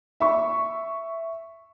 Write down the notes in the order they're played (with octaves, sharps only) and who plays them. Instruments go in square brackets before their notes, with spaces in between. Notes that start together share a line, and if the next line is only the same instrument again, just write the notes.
[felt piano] E5 C#6